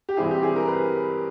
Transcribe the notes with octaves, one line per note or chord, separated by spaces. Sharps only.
G4
G2 E3 G3 C4 E4 G#4
G4
G#4
A#4
B4